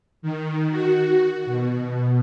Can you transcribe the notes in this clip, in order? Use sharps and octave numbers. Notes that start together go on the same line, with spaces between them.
D#3
F#4
B2